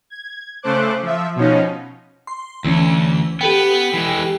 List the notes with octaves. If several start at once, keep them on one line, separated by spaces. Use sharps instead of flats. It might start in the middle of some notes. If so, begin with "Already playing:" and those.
G#6
C#3 A3 C5 D6 F#6
F3 E5
B2 F3 C#4 D#4
C6
D2 E3 C#4
B3 G4 A4 B4 G5
E3 G#3